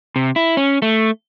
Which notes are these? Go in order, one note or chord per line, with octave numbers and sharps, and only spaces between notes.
C3
E4
C#4
A3